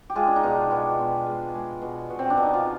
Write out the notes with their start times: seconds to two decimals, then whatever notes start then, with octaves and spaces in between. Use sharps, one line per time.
0.10 G4
0.15 G#3 F4 G#4
0.27 D4
0.36 D#4
0.43 B2 D4 F4
0.71 B2 G4 B4
0.99 B2
1.26 G#3
1.54 G#3
1.82 B2
2.10 B2
2.19 C4
2.30 D4
2.37 B2
2.42 D#4
2.54 F4